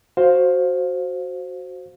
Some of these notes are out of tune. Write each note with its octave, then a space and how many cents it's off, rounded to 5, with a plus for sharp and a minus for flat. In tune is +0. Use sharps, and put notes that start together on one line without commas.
F#4 +0 C5 +5 F5 +10